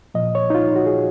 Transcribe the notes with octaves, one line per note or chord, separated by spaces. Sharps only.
A#2 F3 D#5
C#5
D#4
F4
F#4
G#4